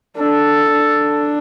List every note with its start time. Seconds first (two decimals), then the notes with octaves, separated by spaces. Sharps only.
0.17 D4 A4
0.73 D4